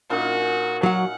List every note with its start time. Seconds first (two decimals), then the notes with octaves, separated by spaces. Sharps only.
0.10 A#2 C#4 D#4 F#4
0.83 F#3 F#4 F#5